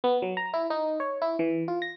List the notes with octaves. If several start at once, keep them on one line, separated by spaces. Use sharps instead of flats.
B3
F#3
A#5
E4
D#4
C#5
E4
E3
F4
A#6